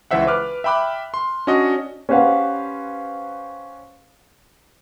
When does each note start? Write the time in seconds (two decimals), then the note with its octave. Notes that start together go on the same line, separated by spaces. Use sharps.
0.11 C#2 E3 C5 E5 F#5
0.27 B4 D6 F6 F#6
0.64 E5 G5 B5 D6 F#6
1.14 C6
1.47 C#4 D4 F#4 D#5
2.09 C#4 G4 B4 C5 F5 F#5